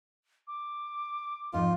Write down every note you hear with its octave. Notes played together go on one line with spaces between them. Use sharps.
D6
F2 G#2 D#4 F4